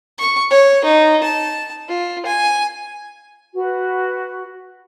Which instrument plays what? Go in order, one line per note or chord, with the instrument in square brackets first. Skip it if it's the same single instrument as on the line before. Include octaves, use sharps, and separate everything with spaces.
[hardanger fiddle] C#6
C#5
D#4
A5
F4
G#5
[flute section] F#4 B4